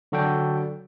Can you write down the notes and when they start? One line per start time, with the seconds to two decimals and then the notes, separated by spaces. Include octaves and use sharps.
0.12 D3 F#3 F#4 A4 D5 G5